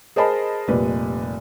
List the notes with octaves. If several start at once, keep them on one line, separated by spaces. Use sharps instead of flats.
G#4 A#4 C5 D#5 A5 B5
F1 A#2 G3 B4